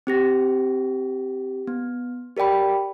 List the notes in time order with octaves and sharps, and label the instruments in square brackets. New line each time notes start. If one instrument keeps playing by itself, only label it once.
[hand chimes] C4 G4 A#6
B3
G4 A#4 D5 G5 B5